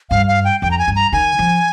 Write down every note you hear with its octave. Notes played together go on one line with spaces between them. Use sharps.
G2 F5
F5
G5
F2 G5
A#5
G#5
G2
A#5
D#3 G#5
F3